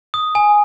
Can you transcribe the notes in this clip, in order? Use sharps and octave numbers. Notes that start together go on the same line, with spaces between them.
D#6
G#5